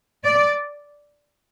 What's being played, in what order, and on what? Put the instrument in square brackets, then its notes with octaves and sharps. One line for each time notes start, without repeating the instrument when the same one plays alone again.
[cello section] D5